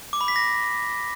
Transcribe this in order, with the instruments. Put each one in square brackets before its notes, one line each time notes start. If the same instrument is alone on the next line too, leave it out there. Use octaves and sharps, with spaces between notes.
[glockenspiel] D6
B5
B6
A#6